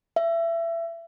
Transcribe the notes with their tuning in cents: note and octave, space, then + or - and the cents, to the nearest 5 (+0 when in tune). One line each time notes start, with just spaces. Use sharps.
E5 +25